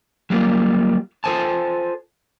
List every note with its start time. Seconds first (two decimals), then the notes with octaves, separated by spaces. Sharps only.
0.30 F#3 G3 A#3 F4
1.24 F4 A4 C5 G#5 A5